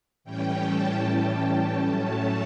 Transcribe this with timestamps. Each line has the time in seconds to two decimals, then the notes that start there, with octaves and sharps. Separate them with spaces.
0.24 A2 E3 G3 C#4 G5
0.63 A5
1.79 A2 F#3 A3 C#4